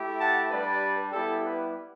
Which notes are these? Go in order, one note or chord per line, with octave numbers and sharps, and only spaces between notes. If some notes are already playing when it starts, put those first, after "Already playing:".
Already playing: A3 E4 G4
F#5 A5
G3 D4 G4 B4 D5
G3 B3 E4 G4 A4
G4 B4